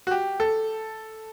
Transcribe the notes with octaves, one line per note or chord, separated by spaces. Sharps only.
F#4
G4
A4